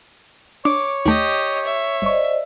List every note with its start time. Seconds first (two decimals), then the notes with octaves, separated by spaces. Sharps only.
0.65 D4 C#5 D6
1.06 D#2 A3 G4 D#5
1.65 E5
2.02 G1 C5 D5 D#5 C#6